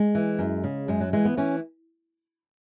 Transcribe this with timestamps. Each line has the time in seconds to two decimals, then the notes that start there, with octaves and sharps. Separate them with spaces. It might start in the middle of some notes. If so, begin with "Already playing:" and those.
Already playing: G#3
0.15 E3
0.39 F#2
0.64 C#3
0.88 F#2 G#3
1.00 F#3
1.13 E3 G#3
1.25 B3
1.37 E3 C#4